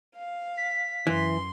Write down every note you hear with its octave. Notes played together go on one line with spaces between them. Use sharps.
F5
B6
F#2 E3 C6